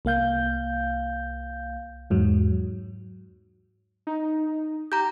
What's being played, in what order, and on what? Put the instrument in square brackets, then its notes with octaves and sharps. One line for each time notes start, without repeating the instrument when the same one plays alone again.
[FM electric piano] C2 A#3 F5 G6
E2 G#2 F#3
[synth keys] D#4
[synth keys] G4 [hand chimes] A#5 G6